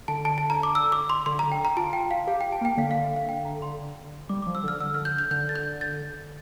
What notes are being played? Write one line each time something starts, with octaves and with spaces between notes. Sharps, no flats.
D3 A5
A5
A5
A#5
D6
E6
D6
C6
D3 C6
A#5
D3
G5
A#5
F4 A5
G5
F5
G4 F5
G5
A5
A#3 G5
D3 F5
F5
E5
F5
G5
A#5
C6
G3 D6
D6
F3
E6
D3 F6
D3 E6
F6
G6
G6
D3 G6
A6
G6
A6